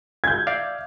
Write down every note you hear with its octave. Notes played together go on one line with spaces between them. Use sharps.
G6 G#6
D5 E5 F5